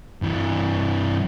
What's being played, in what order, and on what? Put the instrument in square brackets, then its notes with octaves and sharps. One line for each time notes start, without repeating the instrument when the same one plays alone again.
[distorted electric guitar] G2 E3